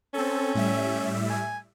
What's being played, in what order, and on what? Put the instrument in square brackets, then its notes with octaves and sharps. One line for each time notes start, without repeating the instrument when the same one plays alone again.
[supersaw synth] C4 A4 [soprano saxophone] C#4
[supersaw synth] A2 G3 E5
[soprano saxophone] G#5